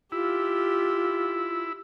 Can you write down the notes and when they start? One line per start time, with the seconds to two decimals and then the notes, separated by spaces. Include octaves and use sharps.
0.12 E4 F4 G4